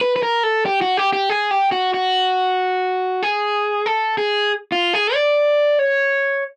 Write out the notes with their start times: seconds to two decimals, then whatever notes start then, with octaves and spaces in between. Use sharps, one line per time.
0.01 B4
0.16 B4
0.23 A#4
0.43 A4
0.66 G4
0.82 F#4
0.97 G4
1.13 G4
1.30 G#4
1.51 G4
1.72 F#4
1.94 F#4
3.23 G#4
3.86 A4
4.18 G#4
4.72 F4
4.93 G#4
5.14 D5
5.79 C#5